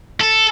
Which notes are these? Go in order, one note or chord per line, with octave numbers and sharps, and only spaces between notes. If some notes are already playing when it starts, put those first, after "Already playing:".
A4